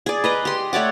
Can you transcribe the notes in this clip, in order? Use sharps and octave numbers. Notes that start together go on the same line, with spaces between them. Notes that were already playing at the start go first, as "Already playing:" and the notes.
G#4 D5
B4 D#5 A#5
G4 C6
A3 C#5 D5 F#5